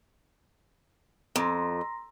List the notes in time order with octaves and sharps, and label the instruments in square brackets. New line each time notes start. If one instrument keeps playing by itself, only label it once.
[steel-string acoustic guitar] F2 [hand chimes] A#5 C6 A#6